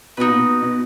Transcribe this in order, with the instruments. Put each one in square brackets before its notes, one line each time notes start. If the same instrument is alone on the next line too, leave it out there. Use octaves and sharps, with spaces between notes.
[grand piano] B2 [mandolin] D#4 F#4 B4
[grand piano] A#2
B2
B2